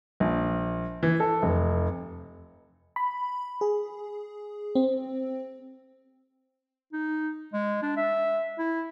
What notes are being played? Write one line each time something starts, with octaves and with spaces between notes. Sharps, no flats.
A#1
E3
A4
F1
B5
G#4
C4
D#4
G#3
D4
E5
E4